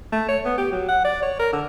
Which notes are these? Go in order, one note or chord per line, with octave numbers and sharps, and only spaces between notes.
A3
C#5
B3
G4
F#3
F#5
D5
C#5
A#4
D3